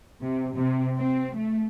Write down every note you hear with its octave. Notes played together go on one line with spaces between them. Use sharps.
C3
C3
C4
A3